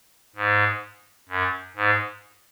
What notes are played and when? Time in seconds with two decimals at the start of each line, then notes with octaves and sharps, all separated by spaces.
0.36 G#2
1.29 F#2
1.76 G#2